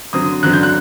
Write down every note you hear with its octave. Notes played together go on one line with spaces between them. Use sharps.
D3 F#3 C4 D#6
D3 F#3 C4 F#6
G6
F#6